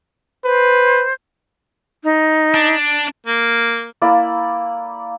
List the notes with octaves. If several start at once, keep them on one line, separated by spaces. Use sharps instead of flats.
B4 C5
D#4
D4
A#3
A#3 E4 D5 E6